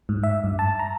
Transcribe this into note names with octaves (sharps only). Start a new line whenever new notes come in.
G#2
E5
G2
A5
A#5